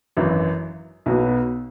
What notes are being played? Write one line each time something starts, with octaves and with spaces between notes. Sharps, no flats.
G#1 F#2 E3
B1 B2 F#3 B3